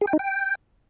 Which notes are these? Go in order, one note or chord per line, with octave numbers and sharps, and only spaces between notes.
G#4
G5
D#4
G5